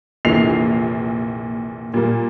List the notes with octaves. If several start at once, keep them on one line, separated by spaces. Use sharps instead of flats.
F1 A#1 A#2 E3 C7 F7
A#2 G3 A#3